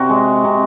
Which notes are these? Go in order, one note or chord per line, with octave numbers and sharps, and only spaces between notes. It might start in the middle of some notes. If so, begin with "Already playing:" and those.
Already playing: C3 F#4
G#3
C3